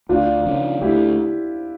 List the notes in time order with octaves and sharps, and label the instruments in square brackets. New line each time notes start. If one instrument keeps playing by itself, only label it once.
[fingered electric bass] D2 [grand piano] D4 F4
[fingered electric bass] C#3 F3 C#4
[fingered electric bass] D2 [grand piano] E4 G4